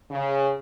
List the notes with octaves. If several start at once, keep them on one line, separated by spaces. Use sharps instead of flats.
C#3